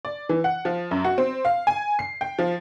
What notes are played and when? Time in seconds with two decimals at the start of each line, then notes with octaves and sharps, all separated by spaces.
0.05 D5
0.29 E3
0.44 F#5
0.65 F3
0.91 F#2
1.05 F#4
1.18 C4
1.45 F5
1.67 G#5
1.99 C7
2.21 G5
2.39 F3